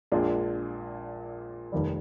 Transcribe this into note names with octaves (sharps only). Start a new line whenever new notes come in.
A#1 A#2 G#3 D4
F1 D#2 D#3 G3